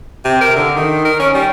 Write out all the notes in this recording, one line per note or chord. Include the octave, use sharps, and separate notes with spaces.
C3
A#4
D3
D#3
A#4
C#4
G3